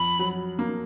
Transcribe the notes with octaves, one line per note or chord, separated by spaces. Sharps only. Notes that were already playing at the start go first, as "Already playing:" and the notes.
Already playing: F2 B5
F#3
A#3